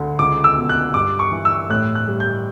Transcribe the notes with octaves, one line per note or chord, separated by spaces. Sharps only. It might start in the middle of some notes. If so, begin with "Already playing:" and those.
Already playing: D2 D3
C#2 D6
E6
B2
F#6
G2 D6
C#6
E3
E6
A2 F#6
F#6
G3
G6